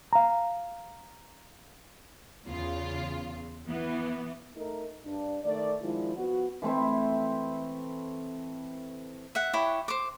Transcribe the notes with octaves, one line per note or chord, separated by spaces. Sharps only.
F5 A#5
E2 C#3 F4
E3 B3
A3 D#4 A#4
G2 D4
D#3 A3 D5
D#3 F3 G#3 D4 E4
F3 B3 F#4
E3 A3 C4 E4
E5 F#5
E4 G4 C#5
C5 D6